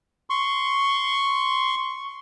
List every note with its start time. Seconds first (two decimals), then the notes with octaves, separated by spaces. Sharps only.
0.30 C6 C#6